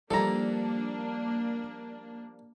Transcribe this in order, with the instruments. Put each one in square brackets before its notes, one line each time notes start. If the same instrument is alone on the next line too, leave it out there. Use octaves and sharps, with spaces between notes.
[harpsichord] F3 G3 D#4 [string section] A#3 D4 [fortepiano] A4 A#5